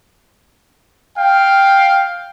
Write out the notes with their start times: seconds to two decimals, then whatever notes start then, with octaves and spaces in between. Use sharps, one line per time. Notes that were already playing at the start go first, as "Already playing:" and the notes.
1.18 F5 G5